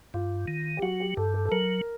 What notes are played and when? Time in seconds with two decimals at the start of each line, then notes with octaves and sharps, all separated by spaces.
0.14 G2 F4
0.48 D#3
0.77 G4
0.82 F#3 F#4
1.00 G4
1.17 G2 A4
1.34 A4
1.45 A4
1.51 F#3 A#4